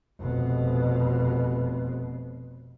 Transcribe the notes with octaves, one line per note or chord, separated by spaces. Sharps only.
F1 B2